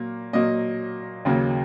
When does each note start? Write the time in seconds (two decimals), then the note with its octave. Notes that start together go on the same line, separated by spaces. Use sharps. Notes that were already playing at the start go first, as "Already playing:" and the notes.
Already playing: A#2 F#3 A#3
0.33 A#2 F#3 A#3 D#5
1.25 D#2 C#3 F#3 A#3